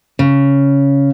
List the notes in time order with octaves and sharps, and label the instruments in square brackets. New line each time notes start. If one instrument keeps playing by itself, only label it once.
[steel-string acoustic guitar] C#3